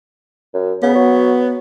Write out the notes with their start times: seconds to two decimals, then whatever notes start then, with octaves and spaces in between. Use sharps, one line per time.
0.54 F#2
0.83 C#3 B3
0.95 F#3